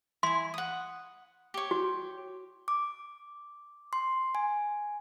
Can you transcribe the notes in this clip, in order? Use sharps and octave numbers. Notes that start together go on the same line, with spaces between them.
E4 G#5 C6
F#5 D#6
G4 C#5
F#4
D6
C6
G#5